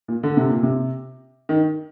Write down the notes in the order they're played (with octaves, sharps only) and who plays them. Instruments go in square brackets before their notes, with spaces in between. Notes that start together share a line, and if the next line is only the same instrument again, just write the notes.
[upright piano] A#2
D3
C3
A#2
C3
D#3